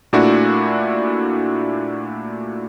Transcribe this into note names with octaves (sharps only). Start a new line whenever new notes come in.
A#2 A3 D4 E4 F#4